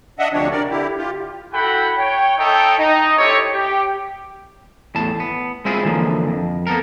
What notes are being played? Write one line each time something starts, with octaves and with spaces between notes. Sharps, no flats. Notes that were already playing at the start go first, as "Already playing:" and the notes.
D4 D#5 E5 F#5
D2 C3 F3 C4 D4 C#5
A#4 D5
D3 E4 G4
F4 G4
E4 F#4 A4 F#5 G5 B5
C#5 G5
D#4 A4 C#5 E5 G5
D#4
C4 E4 G4 A4 C#5
G4
E2 A2 A5
B3
G#3 C4 E4 F4 G#4
D3 E3 F3 A#3
F2
A#3 B3 A4 A#4